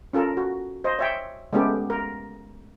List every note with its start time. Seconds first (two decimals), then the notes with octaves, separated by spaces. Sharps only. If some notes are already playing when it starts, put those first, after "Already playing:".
0.13 C#4 F4 A4 A#4
0.37 F#4
0.84 C5 D#5
0.99 C#5 E5 G5
1.53 G#3 A3 B3 C#4 G4 A4
1.90 A#4